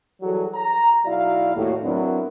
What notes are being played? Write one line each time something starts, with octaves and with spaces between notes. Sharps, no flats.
E3 F#3 G3 F#4 G#4 A4
A#5
B1 E4 F#4 D5 F5
D#2 A2 F#4
F#3 B3 C4 D4 E4 A#4